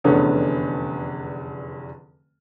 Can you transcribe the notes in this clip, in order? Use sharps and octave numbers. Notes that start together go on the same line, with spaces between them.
F1 E2 D3 B3 C#4 A4